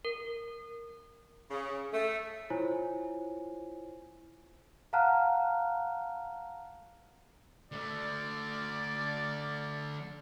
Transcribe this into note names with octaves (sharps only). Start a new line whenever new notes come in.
A#4
C#3
A3
E4 F4 C5 C#5 G#5
F5 F#5 A5 A#5 F6 F#6
D3 A3 D5